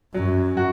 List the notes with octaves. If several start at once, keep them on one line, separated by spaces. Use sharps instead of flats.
F#2 F#3
F#4